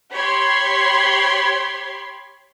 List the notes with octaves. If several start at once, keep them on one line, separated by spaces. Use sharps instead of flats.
G4 C#5 B5 C6 G#6 C7